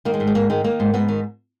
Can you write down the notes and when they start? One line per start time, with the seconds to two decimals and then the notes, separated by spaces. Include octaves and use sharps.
0.05 D#3 A#3
0.14 G#3
0.20 G#2
0.27 G#3
0.35 G#2 A#3
0.50 D#3 G#3
0.64 D#3 A#3
0.80 G#2
0.94 G#2 B3
1.08 D#3